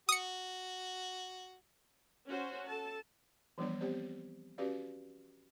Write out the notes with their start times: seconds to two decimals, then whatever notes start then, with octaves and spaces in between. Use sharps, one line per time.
0.09 F#4 D#6 C#7
2.27 C#4 F#4 C5
2.67 A4 A5
3.58 E3 F3 G3 B3 D4 D5
3.80 B3 C4 G4 C5 D5
4.58 C#4 F#4 G4 B4 D5 F5